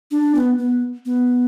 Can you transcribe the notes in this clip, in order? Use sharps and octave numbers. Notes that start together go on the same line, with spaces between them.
D4
B3
B3
B3